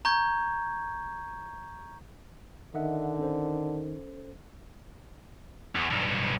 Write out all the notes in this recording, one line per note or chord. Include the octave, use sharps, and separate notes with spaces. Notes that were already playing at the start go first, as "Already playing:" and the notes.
A#5 C#6 G6 G#6
D3 D#3 D#5 E5 F#5
C#4 A4 C5
E2
B1 G2